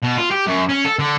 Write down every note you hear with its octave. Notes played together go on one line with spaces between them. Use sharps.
B2
F4
G4
F#2
C#4
A4
D3